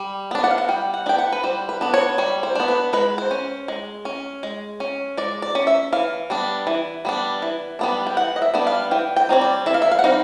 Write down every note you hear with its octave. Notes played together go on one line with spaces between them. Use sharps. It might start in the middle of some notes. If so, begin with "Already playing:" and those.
Already playing: G3
B3 D4
F#5
F5
F#5
G3 G5
F#5
B3 D4 G5
F#5
B4
G3 C5
B4
B3 D4
C#5
G3 C#5
C5
B3 D4
B4
G#3 B4
C5
C#4
G#3
C#4
G#3
C#4
G#3 D5
D5
C#4
E5
E3 F5
G3 B3 D4
E3
G3 B3 D4
E3
G3 B3 D4
G5
E3 F#5
D#5
E5
G3 B3 D4
F5
E3 G5
G5
G3 C4 D#4 C#5
D5
E3 E5
F5
E5
F5
F#5
G3 C4 D#4 F5